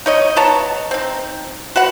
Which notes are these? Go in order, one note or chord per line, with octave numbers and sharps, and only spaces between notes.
D#4 C#5 D#5
B3 C#5 A5 A#5
C4 D#4
F#4 B4 F#5